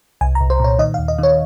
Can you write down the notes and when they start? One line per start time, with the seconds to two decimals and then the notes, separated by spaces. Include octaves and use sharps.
0.21 C2 G#5
0.35 A#5
0.40 C2
0.50 C5
0.60 A#2 C#5
0.79 D#3 D#5
0.94 F5
0.98 D#2
1.08 D#5
1.19 D#3 C#5